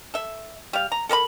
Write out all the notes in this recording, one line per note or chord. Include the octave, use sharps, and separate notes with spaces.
A4 E5
G3 F5
A#5
A4 A#4 A5 B5